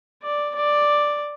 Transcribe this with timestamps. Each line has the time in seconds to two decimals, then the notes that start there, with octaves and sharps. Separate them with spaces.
0.23 D5
0.55 D5